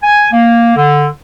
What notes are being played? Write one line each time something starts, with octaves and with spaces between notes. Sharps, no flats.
G#5
A#3
D3